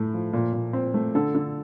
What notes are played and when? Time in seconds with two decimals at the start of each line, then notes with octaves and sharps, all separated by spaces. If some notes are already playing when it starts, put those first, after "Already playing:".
Already playing: A2 A3
0.14 F3
0.33 A#2
0.53 A#2
0.73 C4
0.94 A3
1.15 D3 A4
1.35 D3